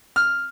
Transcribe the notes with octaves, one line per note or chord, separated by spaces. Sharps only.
F6